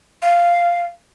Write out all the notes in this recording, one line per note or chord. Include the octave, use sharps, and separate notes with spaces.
F5